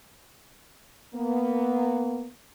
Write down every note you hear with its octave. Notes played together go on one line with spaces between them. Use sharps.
A#3 B3